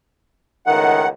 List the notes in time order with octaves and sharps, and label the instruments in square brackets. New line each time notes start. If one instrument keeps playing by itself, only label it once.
[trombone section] C#2 A2 D#3 [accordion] F#5